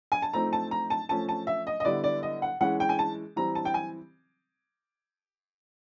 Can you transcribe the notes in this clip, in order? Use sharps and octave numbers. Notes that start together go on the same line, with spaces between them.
G#5
A5
F3 A3 C4 D#4 A#5
A5
A#5
A5
F3 A3 C#4 A5
A5
E5
D#5
D#5
D3 G3 B3 E4 D5
D5
D#5
F#5
E3 G#3 C#4 F#5
G5
G#5
A5
E3 G3 C4 A#5
A5
G5
G#5